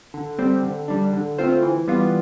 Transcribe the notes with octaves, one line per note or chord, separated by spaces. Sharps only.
D3
G3 C4
D3
G3 D4
D3
A3 C4 F4 C5
E3
G3 B3 F4